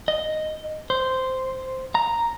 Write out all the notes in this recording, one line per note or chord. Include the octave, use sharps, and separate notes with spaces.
D#5
C5
A#5